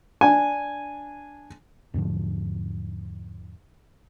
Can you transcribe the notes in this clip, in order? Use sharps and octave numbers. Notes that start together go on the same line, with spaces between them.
D4 G#5
E2 G#2 D3 F3